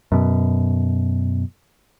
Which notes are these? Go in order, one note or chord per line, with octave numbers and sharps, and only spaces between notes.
F#2 B2